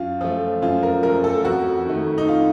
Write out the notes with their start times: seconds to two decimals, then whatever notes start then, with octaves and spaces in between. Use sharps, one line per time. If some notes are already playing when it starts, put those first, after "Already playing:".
Already playing: F#2 F4
0.21 F3 A3
0.62 F#2 F4
0.83 A#4
1.03 F3 A3 A#4
1.24 A4
1.45 F2 F#4
1.86 D#3 A3
2.18 D#4
2.28 F4